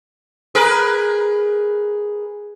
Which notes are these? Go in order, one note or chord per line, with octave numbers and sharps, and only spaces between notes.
G#4 A#4 B4